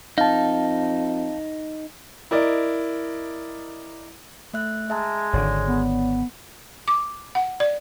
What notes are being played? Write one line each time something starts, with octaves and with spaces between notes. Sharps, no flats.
F2 D#4 F5 A5
E4 A#4 D5 D#5
A3 E5 F#6
G#3 E5 A5 A#5
G#1 D3 C#5 D5
B3
D6
F#5
D5